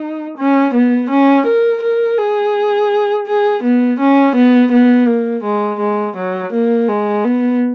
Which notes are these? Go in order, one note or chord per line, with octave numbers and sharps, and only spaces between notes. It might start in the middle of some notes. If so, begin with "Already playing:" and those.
Already playing: D#4
C#4
B3
C#4
A#4
A#4
G#4
G#4
B3
C#4
B3
B3
A#3
G#3
G#3
F#3
A#3
G#3
B3